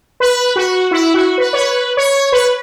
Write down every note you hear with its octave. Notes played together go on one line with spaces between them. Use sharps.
B4
F#4
E4
F#4
B4
C#5
B4
C#5
B4